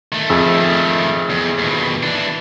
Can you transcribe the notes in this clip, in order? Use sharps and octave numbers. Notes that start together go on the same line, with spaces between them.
D#3 A3
F2 G#4 E6
E2
D#2 B2
E3 D4